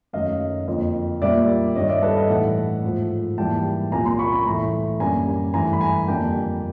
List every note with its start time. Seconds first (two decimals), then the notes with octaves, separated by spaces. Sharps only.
0.13 F#2 D#3 F#3 A3 D#5 F5
0.68 F2 D3 F3 A#3
1.22 A#2 G3 A#3 D5 E5
1.76 G2 D#3 G3 C#5 D#5
1.89 D5 E5
2.02 A4 B4
2.16 D#5 F5
2.30 A2 E3 A3 E5 F#5
2.84 G#2 F3 A3
3.38 G#2 E3 G3 A#3 G5 A5
3.92 C2 A#2 F#3 A#3 G#5 A#5
4.05 A#5 C6
4.19 B5 C#6
4.32 B5 C#6
4.46 A2 E3 A3 A#5 C6
5.00 F#2 D3 G3 A#3 G#5 A#5
5.54 G2 E3 A3 G#5 A#5
5.73 B5
5.81 G#5 A#5
6.08 F2 D3 G3 A#3 G5 A5